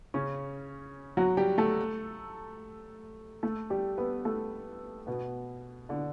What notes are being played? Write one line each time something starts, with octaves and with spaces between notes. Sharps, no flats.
C#3 C#4
F#3 F#4
G3 G4
A3 A4
A3 A4
G3 G4
B3 B4
A3 A4
B2 B3
D3 D4